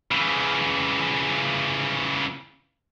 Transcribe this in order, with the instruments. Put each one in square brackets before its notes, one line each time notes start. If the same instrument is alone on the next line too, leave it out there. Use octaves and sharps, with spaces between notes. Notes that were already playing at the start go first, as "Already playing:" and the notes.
[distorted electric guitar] C#3 E3